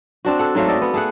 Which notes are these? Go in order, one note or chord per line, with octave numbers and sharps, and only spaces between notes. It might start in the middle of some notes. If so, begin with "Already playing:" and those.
C4 D4 F#4
A4 F#5
G#2 F#3 A3 F5
A4 D5 D#5 G5
B3
A3 G#4 F#5